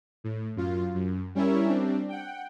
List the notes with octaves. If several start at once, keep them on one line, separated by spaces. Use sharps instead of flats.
A2
F#2 F4
F#2
G3 C#4 E4 A#4 C#5 E5
G3 C4 D4
F#5 G5